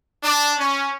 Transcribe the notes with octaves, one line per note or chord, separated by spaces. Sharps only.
D4
C#4